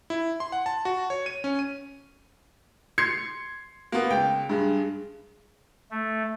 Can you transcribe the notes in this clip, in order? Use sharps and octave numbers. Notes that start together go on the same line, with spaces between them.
E4
C6
F#5
A5
F#4
C#5
D#7
C#4
D#7
C6 G#6 C7 C#7
A#3 B3
C#2 G5
G2 G#3
A3